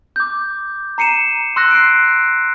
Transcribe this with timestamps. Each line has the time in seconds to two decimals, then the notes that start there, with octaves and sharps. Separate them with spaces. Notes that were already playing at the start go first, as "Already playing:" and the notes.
0.16 D6 G6
0.98 A#5 C7 C#7 D#7 E7
1.56 C6 E6 F#6 A#6
1.71 C7 D7